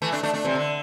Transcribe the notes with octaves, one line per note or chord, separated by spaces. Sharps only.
E3 A3
A3 D4
A3 D4
A3 D4
C3 E3
D3